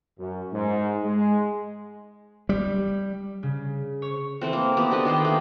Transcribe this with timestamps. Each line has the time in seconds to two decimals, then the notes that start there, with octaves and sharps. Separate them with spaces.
0.19 F#2
0.53 G#2
1.04 G#3
2.49 G3
3.43 C#3
4.02 C#5
4.41 E3 A3 C4
4.53 A#3
4.77 B3 C4 G4
4.91 D4 G4 A4 D#5
5.05 D#3 B3 C5 G5
5.24 A3 A#3